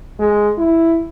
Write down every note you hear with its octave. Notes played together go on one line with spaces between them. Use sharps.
G#3
E4